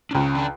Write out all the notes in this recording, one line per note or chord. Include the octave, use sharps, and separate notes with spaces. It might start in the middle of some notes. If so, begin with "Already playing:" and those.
D4
C#2 C#3 C#4
D4